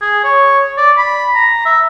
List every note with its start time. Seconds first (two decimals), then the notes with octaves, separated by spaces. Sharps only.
0.01 G#4
0.24 C#5
0.77 D5
0.98 B5
1.35 A#5
1.65 E5